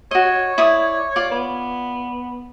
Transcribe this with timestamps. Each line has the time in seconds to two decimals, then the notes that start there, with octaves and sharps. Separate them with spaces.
0.11 F#4 C#5 D#5
0.58 E4 D5 D#6
1.16 F4 D5
1.31 B3